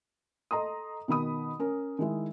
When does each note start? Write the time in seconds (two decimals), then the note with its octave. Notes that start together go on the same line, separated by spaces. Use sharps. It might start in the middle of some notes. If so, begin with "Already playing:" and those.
0.51 A4 D#5 A#5 C6 D#6
1.08 B2 D#3 B5 D#6
1.59 C#4 A#4
1.99 D#3 G#3 E4